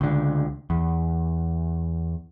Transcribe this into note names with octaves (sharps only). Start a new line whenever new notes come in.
C#2 D3
E2